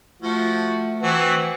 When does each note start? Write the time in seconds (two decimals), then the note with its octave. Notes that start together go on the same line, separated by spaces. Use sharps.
0.22 F3 A3 F#4
1.02 E3 C4 F#4